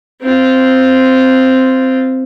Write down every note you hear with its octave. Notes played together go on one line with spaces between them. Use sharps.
C4 F4